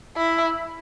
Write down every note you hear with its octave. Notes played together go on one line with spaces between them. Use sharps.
E4